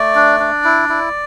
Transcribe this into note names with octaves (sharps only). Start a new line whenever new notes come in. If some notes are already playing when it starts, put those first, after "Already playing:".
Already playing: A3 D5
D4
D4
E4
E4